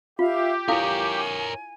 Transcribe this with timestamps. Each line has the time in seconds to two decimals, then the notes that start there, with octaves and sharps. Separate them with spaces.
0.19 F4 G4 E5 F5
0.68 E4 A4 A#4 C#5 F5 G#5